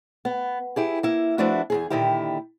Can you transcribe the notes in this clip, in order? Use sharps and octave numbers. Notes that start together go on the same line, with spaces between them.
B3
E4 G4 G#4
A#3 E4
F3 A3 B3 D4 E4 F#4
E2 C3 G#4
A#2 D3 D#3 E4 G4